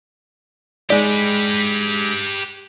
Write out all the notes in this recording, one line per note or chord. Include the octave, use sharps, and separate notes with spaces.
G#3 D#4 G4 B4 D5